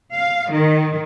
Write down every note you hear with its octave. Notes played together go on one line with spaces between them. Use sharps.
F5
D#3